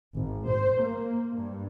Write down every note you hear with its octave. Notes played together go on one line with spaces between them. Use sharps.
G#1
C5
A#3
G2